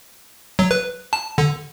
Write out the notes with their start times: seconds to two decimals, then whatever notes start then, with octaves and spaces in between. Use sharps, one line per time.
0.59 F#3
0.71 B4
1.13 A5
1.38 D3